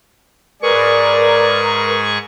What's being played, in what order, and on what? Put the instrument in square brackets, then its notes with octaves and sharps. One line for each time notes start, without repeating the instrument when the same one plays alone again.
[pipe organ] G#2 G#4 C#6 [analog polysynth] A#4 B4 [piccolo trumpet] D5